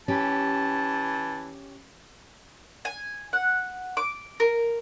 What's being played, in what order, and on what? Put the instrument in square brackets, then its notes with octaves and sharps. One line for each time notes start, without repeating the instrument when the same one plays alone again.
[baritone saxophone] E3 [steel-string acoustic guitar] C#4 G4 [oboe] A5
[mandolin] G#5
F#5
D6
A#4